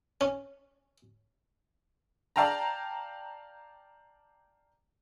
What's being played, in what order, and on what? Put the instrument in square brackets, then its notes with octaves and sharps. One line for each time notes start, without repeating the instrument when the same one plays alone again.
[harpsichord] C#4
[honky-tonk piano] D5 F5 G5 A5 A#5